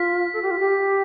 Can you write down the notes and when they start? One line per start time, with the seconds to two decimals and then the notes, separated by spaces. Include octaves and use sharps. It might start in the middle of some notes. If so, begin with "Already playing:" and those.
Already playing: F4 B6
0.33 A4
0.42 G4
0.51 F4
0.60 G4